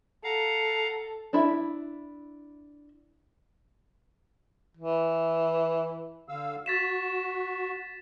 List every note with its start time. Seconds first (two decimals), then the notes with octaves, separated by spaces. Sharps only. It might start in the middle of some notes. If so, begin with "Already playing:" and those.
0.24 A4 F5 F#5 A#5
1.33 D4 E4 E5
4.77 E3
6.29 D3 F5 E6
6.66 F#4 A6 B6 E7